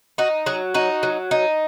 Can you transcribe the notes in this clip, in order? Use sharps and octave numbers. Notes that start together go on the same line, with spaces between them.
D#4 F#4
F#3 G#4
D#4 F#4
F#3
D#4